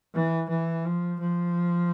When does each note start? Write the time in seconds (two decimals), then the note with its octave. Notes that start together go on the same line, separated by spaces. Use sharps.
0.14 E3
0.49 E3
0.85 F3
1.19 F3